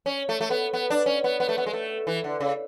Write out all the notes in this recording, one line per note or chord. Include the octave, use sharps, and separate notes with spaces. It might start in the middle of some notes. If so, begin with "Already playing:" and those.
C#4
A3
A3
B3
B3
D4
C#4
B3
B3
A3
B3
G#3
A3
E3
D3
C#3